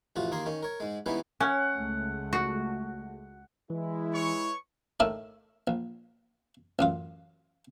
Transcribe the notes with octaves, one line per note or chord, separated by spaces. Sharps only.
A1 F2 C3 F4 F#4
D#2 A#3 G#4 A#4 C6
D#3 C#4
A#4 C#5
G#2 G#3
E3 G3 G#3 B3 C#4 D#4
C#4 F#5
C#2 G#3 A3
F#4
E3 G#3 E4
B4 C#5 C#6
A2 D#3 A3 E4 A#4
A#1
A1 F#2 F4